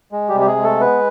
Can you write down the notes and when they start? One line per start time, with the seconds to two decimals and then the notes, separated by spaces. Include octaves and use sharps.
0.12 G#3
0.29 G3 G4
0.35 C3
0.40 G4
0.46 G#3 G#4
0.57 G#3
0.63 A3 A4
0.80 B3 B4